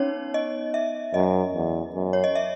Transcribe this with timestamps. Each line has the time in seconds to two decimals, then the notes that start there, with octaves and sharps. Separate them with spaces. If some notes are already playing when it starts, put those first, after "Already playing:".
Already playing: B3 C#4 D#4 C#5
0.34 D#5
0.74 E5
1.14 F#2 D#5
1.54 E2
1.95 F#2
2.13 C#5
2.24 D#5
2.35 E5